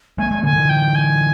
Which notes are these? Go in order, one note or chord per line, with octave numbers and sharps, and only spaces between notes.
G#3 A#3 G#5
G#3 A#3
D3 E3 G#5
D3 E3
G5
G#5